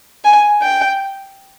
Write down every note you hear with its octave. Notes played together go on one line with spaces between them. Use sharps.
G#5
G5